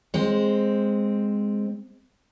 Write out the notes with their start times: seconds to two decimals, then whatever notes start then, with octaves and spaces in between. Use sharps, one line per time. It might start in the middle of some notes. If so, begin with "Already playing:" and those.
0.14 G#3 C4